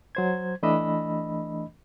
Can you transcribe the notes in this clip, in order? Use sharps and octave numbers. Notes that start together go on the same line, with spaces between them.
F#3 C5 G#6
E3 A3 D4 D#5 B5 E6